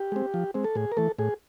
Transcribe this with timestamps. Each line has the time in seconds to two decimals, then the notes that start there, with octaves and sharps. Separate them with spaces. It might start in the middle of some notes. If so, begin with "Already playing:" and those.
Already playing: G4
0.12 G#3 C4
0.34 F3
0.54 G#3 C4
0.64 A4
0.75 A2 G#4
0.92 A#4
0.97 E3 A3 A4
1.19 A2 G#4